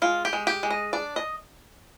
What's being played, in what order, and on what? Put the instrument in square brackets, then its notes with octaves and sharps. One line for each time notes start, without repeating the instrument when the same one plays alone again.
[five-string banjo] G#3 F4
G4
G#3
G4
G#3
D#5
D4 D5
D#5